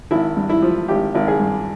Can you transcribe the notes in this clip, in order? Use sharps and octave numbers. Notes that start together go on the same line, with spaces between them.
G#1 E4
G2
E4
F3
G#1 G4
G#1
G#4
G2